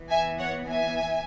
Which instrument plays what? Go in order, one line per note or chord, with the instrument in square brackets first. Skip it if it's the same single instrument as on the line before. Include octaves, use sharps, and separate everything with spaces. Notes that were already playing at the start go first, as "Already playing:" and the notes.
Already playing: [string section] E3 B3
E5 G#5
C#5 F#5
E5 G#5